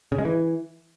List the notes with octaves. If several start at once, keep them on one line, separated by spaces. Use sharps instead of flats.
C#3
G#3
E3